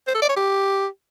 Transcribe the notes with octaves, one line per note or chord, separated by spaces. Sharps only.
C5
A4
D5
C#5
G4